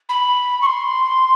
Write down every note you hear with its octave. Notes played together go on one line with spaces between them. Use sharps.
B5
C#6
C6